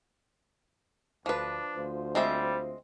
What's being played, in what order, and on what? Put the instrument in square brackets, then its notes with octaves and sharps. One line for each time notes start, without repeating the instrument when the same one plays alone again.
[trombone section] D2 [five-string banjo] F3 B4 [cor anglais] D4
[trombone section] D2 F4 C5
[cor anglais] G3 [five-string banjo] G#3 C4 E5